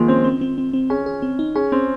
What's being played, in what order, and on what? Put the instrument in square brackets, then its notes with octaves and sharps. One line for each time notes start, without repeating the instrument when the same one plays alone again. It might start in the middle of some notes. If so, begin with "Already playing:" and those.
Already playing: [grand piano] D#3 F3 G#3 [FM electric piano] A#3
[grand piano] C4 [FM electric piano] C#4
[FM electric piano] C4
C4
C4
C4
[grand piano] C#4 [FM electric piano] G#4
[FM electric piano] G#4
C4
D#4
[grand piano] C#4 [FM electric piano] G#4
[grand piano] C4 [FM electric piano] C#4